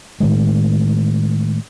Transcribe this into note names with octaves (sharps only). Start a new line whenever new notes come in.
A2 D#3 G#3